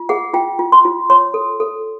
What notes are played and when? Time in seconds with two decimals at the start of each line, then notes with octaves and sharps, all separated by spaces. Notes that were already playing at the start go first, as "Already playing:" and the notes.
Already playing: F4
0.09 G#4 F#5
0.34 F4 G5
0.59 F4
0.72 C6
0.85 F4
1.10 C#5 C6
1.34 A4
1.60 A4